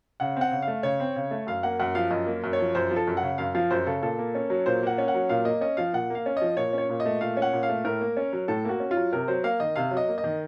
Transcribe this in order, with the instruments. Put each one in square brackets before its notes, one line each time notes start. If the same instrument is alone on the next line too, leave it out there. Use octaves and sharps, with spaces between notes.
[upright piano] C#3 F#5
C4 F#5
C#3
F5
A3
C#3 C#5
C4
C#3
A3
F#2 F5
A#3 F#5
F#2 F#5
F3 F5
F#2 D#5
A#3
F#2
C#5
F3
F#2 C5
F3
A4
F#2
F#5
C#3
F#2 F5
F3 F5
F#2 C5
C#3 A4
A#2 A4
A#3
C#4
F#3
A#2 C5
A#3 F#5
C#4
F#5
F#3
A#2 F5
A#3 D#5
C#4 D#5
F3 F5
A#2 F#5
A#3 F5
C#4
F3 D#5
A#2 C#5
C#4 C#5
A#2
D#5
A3
A#2 F5
C#4
F#5
A#2
F5
A3
A2 A#4
A#3
C#4
F#3
A2 A4
A#3 F#4
C#4
F4
F#3
C3 A#4
F#3 C5
A#3 F5
D#3 D#5
C3 F5
F#3
D#5
A#3
D#5
D#3